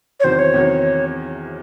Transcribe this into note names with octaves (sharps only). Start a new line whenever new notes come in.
C#5
E2 C3 D#3 F#3 C5
C#5
E2 C3 D#3 F#3